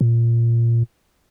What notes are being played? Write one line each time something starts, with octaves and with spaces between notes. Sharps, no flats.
A#2